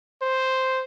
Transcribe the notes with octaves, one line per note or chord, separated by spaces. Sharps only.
C5